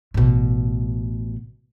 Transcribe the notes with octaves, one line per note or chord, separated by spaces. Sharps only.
A1 B2